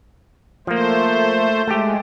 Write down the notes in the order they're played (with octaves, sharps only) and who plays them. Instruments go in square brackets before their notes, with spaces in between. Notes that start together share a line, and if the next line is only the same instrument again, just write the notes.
[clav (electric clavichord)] F3 A#3 [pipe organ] A3 C5
[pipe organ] G#3 [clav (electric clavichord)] A3 G4